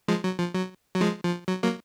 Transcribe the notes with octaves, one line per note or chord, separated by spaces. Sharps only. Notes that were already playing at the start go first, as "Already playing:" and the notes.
F3 G#3
F#3
F3
F#3
F#3
F3 G#3
F3
F#3
F#3 A#3